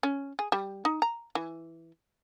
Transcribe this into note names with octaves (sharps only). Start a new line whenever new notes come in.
C#4
G#4
G3
D#4
A#5
E3